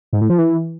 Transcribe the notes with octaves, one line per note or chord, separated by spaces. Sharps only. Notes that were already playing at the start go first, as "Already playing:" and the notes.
G#2
A2
F3
E3